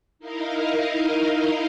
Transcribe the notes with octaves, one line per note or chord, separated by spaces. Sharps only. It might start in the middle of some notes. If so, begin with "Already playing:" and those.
D#4 E4 A#4 D#5 F5